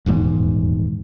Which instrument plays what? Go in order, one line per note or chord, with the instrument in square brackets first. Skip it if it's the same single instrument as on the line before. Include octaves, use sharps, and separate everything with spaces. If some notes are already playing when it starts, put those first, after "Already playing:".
[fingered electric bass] D#1 E2 G#2 B2